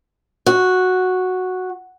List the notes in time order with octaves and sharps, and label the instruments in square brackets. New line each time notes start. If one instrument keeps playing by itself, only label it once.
[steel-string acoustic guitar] F#4